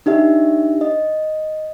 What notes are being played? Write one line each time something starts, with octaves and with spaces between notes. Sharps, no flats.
D4 D#4 G4 E5
D#5